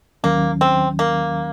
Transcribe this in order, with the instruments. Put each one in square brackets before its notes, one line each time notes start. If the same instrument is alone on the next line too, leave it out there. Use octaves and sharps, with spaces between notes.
[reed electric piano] D#2 D#3 F#3 C#4 [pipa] A#3
[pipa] C4
A#3